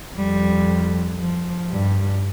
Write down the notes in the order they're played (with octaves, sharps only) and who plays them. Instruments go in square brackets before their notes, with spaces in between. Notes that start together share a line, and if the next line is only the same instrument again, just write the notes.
[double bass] F2 [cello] G3
[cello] F3
[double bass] G2 [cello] G3